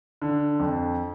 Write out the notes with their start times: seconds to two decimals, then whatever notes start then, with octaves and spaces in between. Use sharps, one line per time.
0.22 D3
0.59 F2